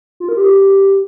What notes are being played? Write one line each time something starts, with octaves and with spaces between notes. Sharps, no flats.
F4
A#4
G4